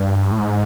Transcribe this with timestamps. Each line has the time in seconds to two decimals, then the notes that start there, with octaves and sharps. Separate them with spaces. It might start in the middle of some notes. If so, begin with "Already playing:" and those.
Already playing: G2
0.32 A2
0.38 G#2